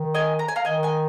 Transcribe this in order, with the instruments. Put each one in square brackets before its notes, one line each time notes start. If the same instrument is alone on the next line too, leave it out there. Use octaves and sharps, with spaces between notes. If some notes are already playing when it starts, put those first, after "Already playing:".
Already playing: [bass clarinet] D#3
[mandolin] D#5 G#5
A#5
G#5
F5 A#5
[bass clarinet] D#3 [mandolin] D#5 G#5
[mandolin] D#5 G#5